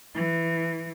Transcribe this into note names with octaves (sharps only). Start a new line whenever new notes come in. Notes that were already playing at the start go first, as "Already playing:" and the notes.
E3